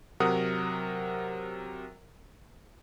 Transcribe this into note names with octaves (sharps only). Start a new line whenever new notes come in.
C3 F#3 A#4 F#5 D#6